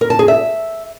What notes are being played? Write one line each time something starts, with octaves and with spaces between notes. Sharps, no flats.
A#4
A5
G#4
E5